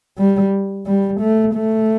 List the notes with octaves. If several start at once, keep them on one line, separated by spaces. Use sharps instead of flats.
G3
G3
A3
A3